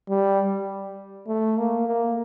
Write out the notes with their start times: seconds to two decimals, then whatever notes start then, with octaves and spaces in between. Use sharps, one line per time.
0.09 G3
1.27 A3
1.58 A#3
1.87 A#3